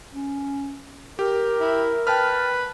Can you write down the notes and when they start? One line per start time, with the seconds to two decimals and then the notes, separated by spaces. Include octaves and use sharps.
0.12 C#4
1.19 G4 A#4
1.60 E4
2.07 B4 G5 A5 F6